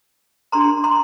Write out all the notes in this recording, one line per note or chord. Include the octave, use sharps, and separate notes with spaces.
D4 G4 A#4 A#5 C6
A#5 C6